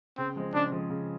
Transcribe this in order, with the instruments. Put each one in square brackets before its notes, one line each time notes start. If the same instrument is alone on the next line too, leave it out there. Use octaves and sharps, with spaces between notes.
[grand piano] C#3 [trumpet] C4
[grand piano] F3 G#3 C4
[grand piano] C#3 [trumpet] D4
[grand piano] F3 G#3 C4
C#3